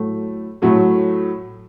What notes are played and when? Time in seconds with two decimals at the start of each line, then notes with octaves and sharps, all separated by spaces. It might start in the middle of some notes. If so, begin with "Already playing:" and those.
Already playing: A2 F#3 A3
0.62 A2 F#3 A3